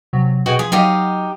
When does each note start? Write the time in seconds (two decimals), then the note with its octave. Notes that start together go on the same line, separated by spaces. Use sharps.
0.13 C3 F#3
0.46 B2 F#4 G#4 D#5 G5
0.59 F3 G#4
0.72 F#3 D#4 G4 D#5 F5